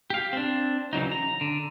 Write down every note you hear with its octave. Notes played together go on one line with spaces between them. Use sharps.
G4 F5
C4 D4
C#3 E3 F#3 D#4
A#5
D3